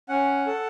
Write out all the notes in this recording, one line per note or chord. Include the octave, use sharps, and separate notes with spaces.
C#4 F#5
A4